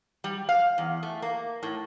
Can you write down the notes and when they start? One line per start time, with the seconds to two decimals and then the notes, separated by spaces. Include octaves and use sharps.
0.24 G3
0.49 F5
0.78 E2
1.03 A3
1.22 A#3
1.63 A2